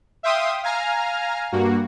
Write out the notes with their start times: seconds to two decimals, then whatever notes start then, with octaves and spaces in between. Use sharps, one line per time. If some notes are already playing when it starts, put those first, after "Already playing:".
0.23 E5 F5 G5 C6 D#6
0.63 F5 G#5 A#5 F6
1.52 G2 A#3 F#4